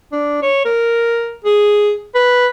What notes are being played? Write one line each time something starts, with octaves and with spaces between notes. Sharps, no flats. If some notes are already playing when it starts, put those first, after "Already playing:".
D4
C#5
A#4
G#4
B4